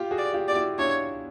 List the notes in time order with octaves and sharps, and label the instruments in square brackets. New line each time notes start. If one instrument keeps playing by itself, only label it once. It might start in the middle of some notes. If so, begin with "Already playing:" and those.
Already playing: [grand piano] F4 G4
F#4 G#4
[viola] D5
[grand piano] F4 G4
[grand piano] G4 [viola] D5
[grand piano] E4 F#4
[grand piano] D4 E4 [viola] C#5